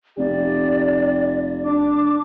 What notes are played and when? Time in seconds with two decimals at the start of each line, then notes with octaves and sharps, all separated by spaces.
0.18 F1 G4 D5
1.65 D4 D6